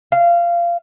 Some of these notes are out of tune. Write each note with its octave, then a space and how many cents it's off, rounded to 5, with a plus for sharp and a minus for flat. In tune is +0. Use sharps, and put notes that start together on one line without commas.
F5 -20